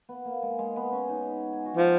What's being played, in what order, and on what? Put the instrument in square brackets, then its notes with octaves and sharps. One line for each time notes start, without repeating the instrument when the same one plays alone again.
[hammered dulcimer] B3
A#3
G#3
G#3
B3
C#4
D#4
G#4
F#4
[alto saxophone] F3 [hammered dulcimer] F4